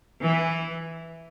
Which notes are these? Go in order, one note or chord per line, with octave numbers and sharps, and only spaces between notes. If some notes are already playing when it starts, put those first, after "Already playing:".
E3